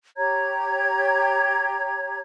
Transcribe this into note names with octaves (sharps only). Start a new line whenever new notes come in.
G4 C#5 A#5 G#6